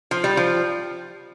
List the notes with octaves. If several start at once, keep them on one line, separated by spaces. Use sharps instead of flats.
F3
G3
F3